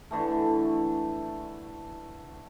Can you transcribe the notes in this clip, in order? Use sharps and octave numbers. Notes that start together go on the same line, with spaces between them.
D3 E3 A3